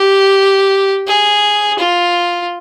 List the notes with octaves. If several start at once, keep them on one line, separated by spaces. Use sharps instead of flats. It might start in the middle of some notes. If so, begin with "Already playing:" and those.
Already playing: G4
G#4
F4